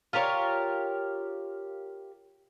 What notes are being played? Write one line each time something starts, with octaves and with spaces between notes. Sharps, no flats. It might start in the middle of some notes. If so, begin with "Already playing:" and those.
F4 G4 A#4 C#5